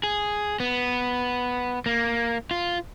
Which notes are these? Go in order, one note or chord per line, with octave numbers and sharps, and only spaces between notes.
G#4
B3
A#3
F4